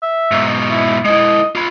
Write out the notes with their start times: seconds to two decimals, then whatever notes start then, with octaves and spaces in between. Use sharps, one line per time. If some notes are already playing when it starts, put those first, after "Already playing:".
0.03 E5
0.31 G#2 B2
0.70 E4
1.05 G#3 E4 D#5
1.55 F4 B5